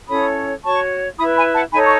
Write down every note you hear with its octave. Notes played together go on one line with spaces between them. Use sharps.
C#4 E4 A4 C#5 B5 D#6
F#4 C#5 A5 C#6
E4 B4 B5 D#6
G#5 B5
F#5 A5
D#4 A4 C#5 G#5 B5
C#6